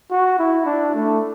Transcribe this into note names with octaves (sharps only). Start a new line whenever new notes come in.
F#4
E4
D4
A3